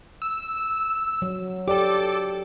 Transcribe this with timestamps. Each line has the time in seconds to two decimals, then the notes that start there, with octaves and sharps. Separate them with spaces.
0.22 E6
1.22 F#3
1.68 G4 A4 D5 D6